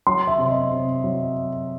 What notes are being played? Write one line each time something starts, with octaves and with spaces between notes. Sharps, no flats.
F#3 C6
E5
C3
D#5
C3
F#3